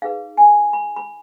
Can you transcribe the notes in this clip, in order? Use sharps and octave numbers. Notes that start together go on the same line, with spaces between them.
D#4 G#4 B4 F5
G#5
B5
B5